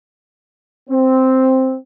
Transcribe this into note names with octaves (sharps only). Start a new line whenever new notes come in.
C4